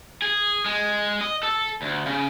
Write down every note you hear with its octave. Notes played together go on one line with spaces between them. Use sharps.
G#4
G#3
D#5
A4
D2
C#3